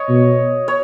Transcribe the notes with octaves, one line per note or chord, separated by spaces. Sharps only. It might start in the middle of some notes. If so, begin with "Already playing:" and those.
Already playing: C#5 D#5
B2
C#5